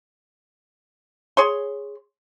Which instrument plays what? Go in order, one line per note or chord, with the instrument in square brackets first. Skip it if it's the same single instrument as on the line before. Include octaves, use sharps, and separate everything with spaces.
[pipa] G#4 C#5 C6